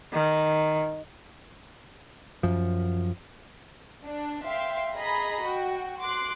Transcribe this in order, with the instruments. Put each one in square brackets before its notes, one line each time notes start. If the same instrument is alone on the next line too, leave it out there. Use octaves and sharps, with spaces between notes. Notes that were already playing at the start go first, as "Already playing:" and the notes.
[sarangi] D#3
[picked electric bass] F#2 F3
[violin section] D4
E5 F5 G5 C6
G#4 D#5 A#5 B5
F#4 G5
C6 D6 F#6